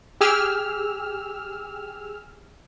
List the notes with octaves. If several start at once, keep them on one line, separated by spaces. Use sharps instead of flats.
G4 G#4 E6 F6